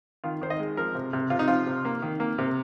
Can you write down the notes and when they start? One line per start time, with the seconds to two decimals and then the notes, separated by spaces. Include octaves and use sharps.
0.24 D#3 F4
0.42 D#3 C5
0.50 D#5
0.60 G#3
0.77 F3 A#4
0.95 C3
1.13 C3
1.30 C3 F4
1.39 D#4
1.48 F3 F4
1.66 C3
1.85 A#3
2.02 D#3
2.20 A#3
2.38 C3